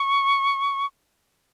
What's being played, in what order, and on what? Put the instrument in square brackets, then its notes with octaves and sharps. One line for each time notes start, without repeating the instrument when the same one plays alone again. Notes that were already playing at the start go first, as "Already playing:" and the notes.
Already playing: [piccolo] C#6